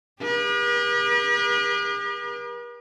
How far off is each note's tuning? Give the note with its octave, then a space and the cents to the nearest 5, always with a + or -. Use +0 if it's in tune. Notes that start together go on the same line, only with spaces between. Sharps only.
G4 +45 B4 -45